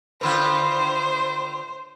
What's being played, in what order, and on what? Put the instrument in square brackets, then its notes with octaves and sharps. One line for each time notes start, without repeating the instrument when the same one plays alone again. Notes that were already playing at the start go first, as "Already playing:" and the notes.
[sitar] A2 D3 F4 [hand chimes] B4 B5 [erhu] C5